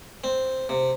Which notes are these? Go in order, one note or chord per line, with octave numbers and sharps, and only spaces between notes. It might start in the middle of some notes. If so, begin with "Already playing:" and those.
C4
C3